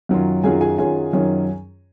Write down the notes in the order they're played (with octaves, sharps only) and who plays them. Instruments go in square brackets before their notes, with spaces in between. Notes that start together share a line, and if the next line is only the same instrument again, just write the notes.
[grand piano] F#2 D#3 F#3 C#4 F4
F#2 D#3 F#3 C#4 F4 G#4 G#5
G#4 G#5
F#2 D#3 F#3 C#4 F4 G#4 G#5
F#2 D#3 F#3 C#4 F4